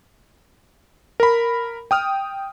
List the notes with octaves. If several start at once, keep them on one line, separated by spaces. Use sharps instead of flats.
A#4 B5
G5 D#6 F6